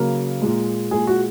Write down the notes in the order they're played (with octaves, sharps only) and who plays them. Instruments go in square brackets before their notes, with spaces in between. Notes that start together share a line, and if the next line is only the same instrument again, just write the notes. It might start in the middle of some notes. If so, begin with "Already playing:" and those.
Already playing: [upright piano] C#3 F#3 A#3 A#4
A#2 G#3
A#2 G#3 G#4
F#4